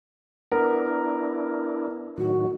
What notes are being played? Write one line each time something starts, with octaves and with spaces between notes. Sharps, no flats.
B3 D4 E4 A#4
A2 D#3 F#3 F#4